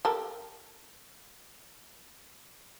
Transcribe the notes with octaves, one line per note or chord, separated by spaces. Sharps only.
G4 A4 A#4